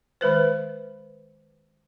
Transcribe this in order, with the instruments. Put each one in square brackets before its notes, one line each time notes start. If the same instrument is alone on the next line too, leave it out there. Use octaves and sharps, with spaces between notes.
[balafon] D#3 G#3 B4 C5